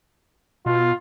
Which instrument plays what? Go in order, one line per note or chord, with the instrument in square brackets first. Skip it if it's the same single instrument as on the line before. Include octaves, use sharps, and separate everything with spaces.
[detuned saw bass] B2 [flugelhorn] F4